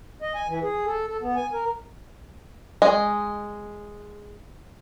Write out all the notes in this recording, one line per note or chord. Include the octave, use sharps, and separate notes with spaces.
D#5
G#5
E3
G#4
A4
A4
B3
G#5
A#4
G#3 D#5